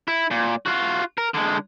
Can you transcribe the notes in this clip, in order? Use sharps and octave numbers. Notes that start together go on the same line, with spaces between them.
E4
A#2
F4 F#4
A#4
D3 G#3